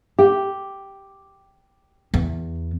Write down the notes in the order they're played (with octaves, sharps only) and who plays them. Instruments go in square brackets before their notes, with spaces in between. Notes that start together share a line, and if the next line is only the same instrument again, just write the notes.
[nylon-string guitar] G4
[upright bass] E2